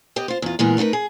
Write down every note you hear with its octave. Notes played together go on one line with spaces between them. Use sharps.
B3 G4 D#5
F4 C5
E2 F4
A#2 E3 G#3 B3 A#4
A3 D#4 F#4 A#4 B4
G#4